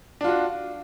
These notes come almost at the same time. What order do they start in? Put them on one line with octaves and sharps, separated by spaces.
D4 F4 F#4